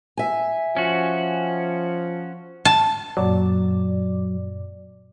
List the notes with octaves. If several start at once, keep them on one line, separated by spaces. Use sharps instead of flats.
E5 G#5
F3 C#4 F#4
A5
F#2 A#2 F#3 D5